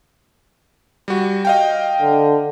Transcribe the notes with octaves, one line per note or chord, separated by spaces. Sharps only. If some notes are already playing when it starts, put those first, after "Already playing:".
G3 F#4
D#5 F5 G5
D3